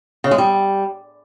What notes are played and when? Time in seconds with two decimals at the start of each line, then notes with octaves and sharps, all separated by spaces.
0.24 C#3
0.31 G#3
0.38 G3